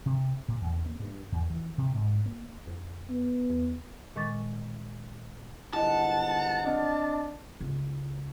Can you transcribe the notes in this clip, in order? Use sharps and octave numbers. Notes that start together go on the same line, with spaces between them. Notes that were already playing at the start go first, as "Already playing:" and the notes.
C3
A#2
E2
A#3
G2
E2
E3
C3
G#2
A#3
F2
B3
E2
A#2 D#3 G#3 C#6 D6 A6
G1 G#2 E4 D#5 F#5 A5
C4 D4 D#5
C#2